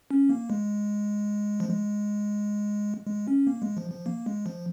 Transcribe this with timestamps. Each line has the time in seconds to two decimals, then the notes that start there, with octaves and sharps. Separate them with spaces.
0.11 C#4
0.29 A#3
0.50 G#3
1.60 F3
1.69 G#3
3.07 G#3
3.28 C#4
3.47 A#3
3.62 G#3
3.77 F3
3.92 F3
4.06 A#3
4.26 G#3
4.46 F3